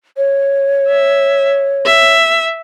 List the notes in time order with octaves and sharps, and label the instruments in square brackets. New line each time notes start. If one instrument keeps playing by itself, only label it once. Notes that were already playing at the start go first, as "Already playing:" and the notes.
[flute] C#5
[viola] E5
E5